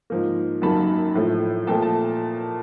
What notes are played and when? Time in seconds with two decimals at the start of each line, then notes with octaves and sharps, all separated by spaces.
0.10 G#2 F3 A#3
0.62 F#2 D#3 F#3 A#3 A5 B5
1.15 A2 F3 A3
1.67 A#2 F3 A3 G5 A5
1.83 A5